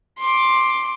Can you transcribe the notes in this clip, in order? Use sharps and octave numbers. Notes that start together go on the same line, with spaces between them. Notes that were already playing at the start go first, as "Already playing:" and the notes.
C6 D6